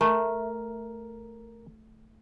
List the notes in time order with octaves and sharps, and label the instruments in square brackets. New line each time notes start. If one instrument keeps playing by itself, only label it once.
[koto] A3 [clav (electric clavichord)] A#4